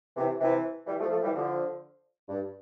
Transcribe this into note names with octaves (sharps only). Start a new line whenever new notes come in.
C3 E3
C3 E3
E3 G3
F3 A3
F3 A3
E3 G3
D3 F3
G2